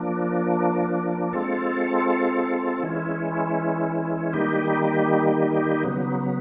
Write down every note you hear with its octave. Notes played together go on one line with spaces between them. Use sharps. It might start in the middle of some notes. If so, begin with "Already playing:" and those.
Already playing: F3 A#3 D4
G#3 C4 F4 A4
E3 G#3 C#4 E4
D#3 G3 A#3 D#4 G4
C#3 F#3 B3